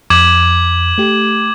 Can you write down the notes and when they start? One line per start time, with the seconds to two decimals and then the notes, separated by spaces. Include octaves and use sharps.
0.10 F2 D6 G#6 F#7
0.98 A3 G4